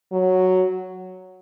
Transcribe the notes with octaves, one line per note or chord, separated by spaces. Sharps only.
F#3